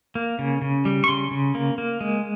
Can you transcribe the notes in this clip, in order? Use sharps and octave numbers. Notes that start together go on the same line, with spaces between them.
A#3
C#3
C#3
G3
C#6
C#3 C6
C#3
A#3
A#3
G#3